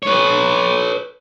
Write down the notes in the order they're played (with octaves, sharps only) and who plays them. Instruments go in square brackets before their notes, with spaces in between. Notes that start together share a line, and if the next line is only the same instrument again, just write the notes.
[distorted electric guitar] B4 C#5